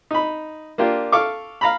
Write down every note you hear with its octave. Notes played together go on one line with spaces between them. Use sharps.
D#4 B5
A#3 D4 F4 G4
A4 F5 C#6 D6
F5 A#5 B5